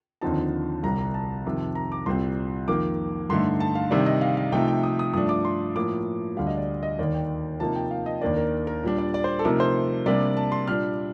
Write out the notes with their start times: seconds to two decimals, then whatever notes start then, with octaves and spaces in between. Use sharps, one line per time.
0.21 D#2 D3 F3 C4 D#4 A5
0.83 C2 C3 G3 A#5
0.98 A#5
1.14 A5
1.45 F2 C3 D#3
1.75 A#5
1.92 D6
2.06 C2 A#2 G3 C4 C6
2.68 F2 D#3 A#3 D6
3.29 G2 D3 A3 D#4 C6
3.60 A5
3.75 F5
3.90 C3 D#3 G3 D4 D5
4.06 D#5
4.21 F5
4.37 F5
4.52 C3 F3 A3 D#4 G5
4.68 G5
4.83 D#6
4.99 D#6
5.14 G2 F3 A3 D4 D#6
5.29 D6
5.45 C6
5.75 A2 F3 A#3 D6
6.37 D2 D3 G3 F5
6.47 D#5
6.58 D5
6.83 D#5
6.99 D#2 D#3 A#3 D5
7.14 G5
7.60 C3 F3 A#3 D#4 A5
7.76 G5
7.91 F5
8.06 D#5
8.21 D#2 D#3 A#3 D4 D5
8.37 A#4
8.67 A#4
8.83 A#2 G3 D4
8.99 D5
9.14 D5
9.24 C5
9.39 A4
9.44 C3 F3 A3 D#4 A#4
9.60 C5
10.06 C3 G3 A#3 D4 D5
10.37 A5
10.52 C6
10.67 A#2 G3 D4 F6